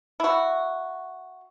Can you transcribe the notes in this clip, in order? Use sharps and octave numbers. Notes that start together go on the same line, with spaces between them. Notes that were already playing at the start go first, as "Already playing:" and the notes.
E4 F#4